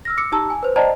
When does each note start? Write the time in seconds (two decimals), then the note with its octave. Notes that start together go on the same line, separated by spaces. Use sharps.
0.05 E6 F6 A#6
0.17 D6 E6 C#7
0.32 D#4 G4 A5 A#5 E6
0.50 G#5
0.63 B4 C5
0.76 C5 D5 D#5 G5 A5 A#5